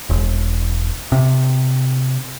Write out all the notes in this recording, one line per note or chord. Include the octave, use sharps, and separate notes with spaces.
E1
C3